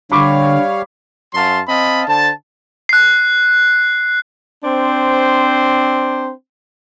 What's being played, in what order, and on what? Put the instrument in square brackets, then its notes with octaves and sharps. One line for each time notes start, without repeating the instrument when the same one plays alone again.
[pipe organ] D3 [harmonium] G3 C#5 F5 [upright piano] B5 C#6 D6
[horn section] F#2 F#3 F5 A5 C6
C4 D#5 F5 A5 B5
D3 C5 A5
[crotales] F#6 C7
[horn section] C4 D4 C5